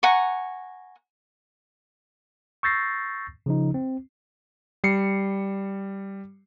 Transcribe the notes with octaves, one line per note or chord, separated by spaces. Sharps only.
F#5 G#5 A#5 C#6
C#6 E6 G6 A6 A#6 C7
C#3 F3 D#4
C4
G3 C7 C#7